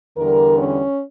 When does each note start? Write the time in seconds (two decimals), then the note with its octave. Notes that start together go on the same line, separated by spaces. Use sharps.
0.17 E2 D3 G3 A#4
0.57 C#4